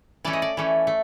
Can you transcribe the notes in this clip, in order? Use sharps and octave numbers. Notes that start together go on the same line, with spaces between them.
E3 A3 C#4 D5
D#5
D5
E3 A3 C#4
A3